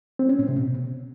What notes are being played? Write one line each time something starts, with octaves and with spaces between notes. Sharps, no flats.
C4
C#4
A2
C3
B2